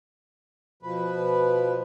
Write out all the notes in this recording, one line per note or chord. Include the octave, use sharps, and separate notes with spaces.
B2 F3 B4